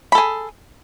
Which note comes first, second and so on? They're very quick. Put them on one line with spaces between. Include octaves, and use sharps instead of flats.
B5 A4 G#4